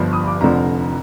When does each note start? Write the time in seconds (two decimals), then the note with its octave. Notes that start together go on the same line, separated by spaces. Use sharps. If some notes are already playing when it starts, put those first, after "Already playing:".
Already playing: G1 G2 F3
0.13 D#6
0.27 D6
0.41 F1 F2 D3 F3 A#5